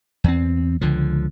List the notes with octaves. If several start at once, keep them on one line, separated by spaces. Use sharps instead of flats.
E2 C4
C#2 D3 F3